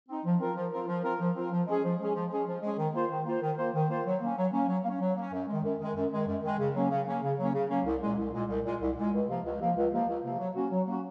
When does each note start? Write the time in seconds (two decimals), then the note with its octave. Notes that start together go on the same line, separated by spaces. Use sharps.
0.08 C4 D#4
0.25 F3
0.40 C4 F4 A#4
0.56 F3
0.72 C4 F4 A#4
0.88 F3
1.04 C4 F4 A#4
1.20 F3
1.36 C4 F4 A#4
1.52 F3
1.67 G#3 C#4 G#4
1.84 F3
1.99 G#3 C#4 G#4
2.15 F3
2.30 G#3 C#4 G#4
2.47 F3
2.62 G#3 C#4 G#4
2.78 D#3
2.94 A#3 F4 C5
3.10 D#3
3.26 A#3 F4 C5
3.41 D#3
3.58 A#3 F4 C5
3.74 D#3
3.89 A#3 F4 C5
4.06 F#3
4.21 A#3 C#4
4.36 F#3
4.53 A#3 C#4
4.68 F#3
4.84 A#3
4.89 C#4
5.01 F#3
5.16 A#3 C#4
5.32 F#2
5.47 D#3 G#3
5.64 F#2
5.80 D#3 G#3
5.95 F#2
6.12 D#3 G#3
6.27 F#2
6.43 D#3 G#3
6.59 C#3
6.75 F#3 A#3 C#4
6.90 C#3
7.07 F#3 A#3 C#4
7.22 C#3
7.38 F#3 A#3 C#4
7.54 C#3
7.69 F#3 A#3 C#4
7.85 C2
8.02 A#2 G#3
8.18 C2
8.33 A#2 G#3
8.49 C2
8.65 A#2 G#3
8.81 C2
8.97 A#2 G#3
9.13 C#2
9.28 C3 F3 A#3
9.45 C#2
9.60 C3 F3 A#3
9.76 C#2
9.92 C3 F3 A#3
10.08 C#2
10.24 C3 F3 A#3
10.39 F#3
10.55 A#3 C#4 F#4
10.71 F#3
10.87 A#3 C#4 F#4